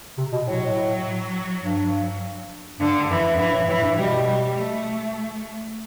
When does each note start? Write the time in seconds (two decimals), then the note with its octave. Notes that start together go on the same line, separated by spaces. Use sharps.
0.18 C3
0.32 B2
0.47 A2 F#3
0.56 B2
0.64 A2
1.63 G2
2.79 G2 D3
3.09 F#2 E3
3.34 F#2
3.38 G2 E3
3.53 A2
3.68 A2 E3
3.82 G2
3.96 B2 G3
4.26 G3
4.55 A3